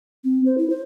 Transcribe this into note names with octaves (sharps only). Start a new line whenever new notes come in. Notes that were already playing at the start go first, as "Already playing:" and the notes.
C4
C5
E4
C5